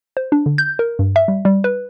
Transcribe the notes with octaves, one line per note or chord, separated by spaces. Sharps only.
C5
D4
D3
G6
A#4
G2
E5
G3
G3
B4